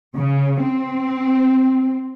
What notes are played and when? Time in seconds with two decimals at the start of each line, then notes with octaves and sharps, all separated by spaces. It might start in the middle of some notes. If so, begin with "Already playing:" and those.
0.16 C#3
0.61 C4